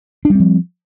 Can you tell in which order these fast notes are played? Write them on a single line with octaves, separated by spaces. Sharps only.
D4 G3 C4 F3